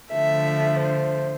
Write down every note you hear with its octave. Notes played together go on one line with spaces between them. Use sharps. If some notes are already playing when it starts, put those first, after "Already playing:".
D3 F3 A3 E5
C5